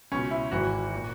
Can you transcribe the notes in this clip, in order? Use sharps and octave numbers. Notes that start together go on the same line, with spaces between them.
C#2 B2 C#4
E4
G#1 G#2 E3 F#4
A#2